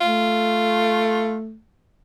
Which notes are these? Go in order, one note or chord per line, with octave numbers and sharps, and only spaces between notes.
A3 F4